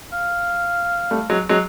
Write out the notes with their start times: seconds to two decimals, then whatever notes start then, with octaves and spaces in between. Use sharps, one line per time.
0.13 F5
1.11 G3 A3
1.30 F#3 G#3
1.49 F#3 G#3